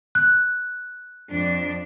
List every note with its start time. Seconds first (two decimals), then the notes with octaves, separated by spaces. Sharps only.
0.15 F#6
1.30 F2 D4